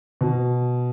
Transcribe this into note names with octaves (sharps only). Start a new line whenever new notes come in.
B2